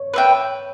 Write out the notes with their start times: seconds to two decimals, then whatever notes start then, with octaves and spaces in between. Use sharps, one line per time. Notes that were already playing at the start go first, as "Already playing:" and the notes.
Already playing: C#5
0.14 B4 E5 G5